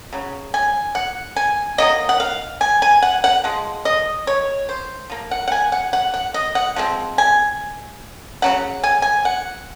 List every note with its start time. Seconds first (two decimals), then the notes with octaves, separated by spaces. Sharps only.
0.13 C#3 F#3
0.54 G#5
0.95 F#5
1.36 G#5
1.78 D#3 F#3 A#3 D#5
2.09 F#5
2.20 F5
2.61 G#5
2.82 G#5
3.02 F#5
3.24 F#5
3.44 F3 G#3
3.85 D#5
4.27 C#5
4.69 C5
5.10 F3 A#3
5.31 F#5
5.48 F#5
5.52 G#5
5.72 F#5
5.93 F#5
6.14 F#5
6.34 D#5
6.55 F#5
6.76 F3 G#3 C4
7.18 G#5
8.42 C#3 F#3 C#4 F#5
8.84 G#5
9.02 G#5
9.25 F#5